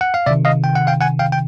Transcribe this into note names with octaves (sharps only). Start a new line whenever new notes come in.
F#5
F5
C3 D#3 D5 E5
D#5 F5
G5
F#5
F5 G5
F#5 G#5
F5 G5
G5